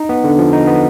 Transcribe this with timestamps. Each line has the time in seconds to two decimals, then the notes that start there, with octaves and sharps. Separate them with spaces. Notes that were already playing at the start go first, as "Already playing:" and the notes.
Already playing: D#4
0.09 B3
0.24 D3
0.38 F3
0.53 D#4
0.67 B3